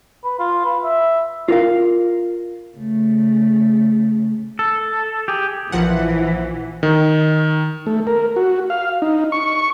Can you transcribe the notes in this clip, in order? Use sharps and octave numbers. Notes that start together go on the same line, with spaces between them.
B4
F4
B4
E5
F4 A#4 F5
C#3 A3
A4
G4 G#4
A#1 E3 F3 F#5
D#3
A3
A#4
F#4
F5
D#4
C#6